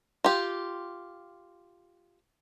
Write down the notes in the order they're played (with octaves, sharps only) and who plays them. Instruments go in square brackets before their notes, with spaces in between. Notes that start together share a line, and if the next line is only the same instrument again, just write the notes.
[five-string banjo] F4 G4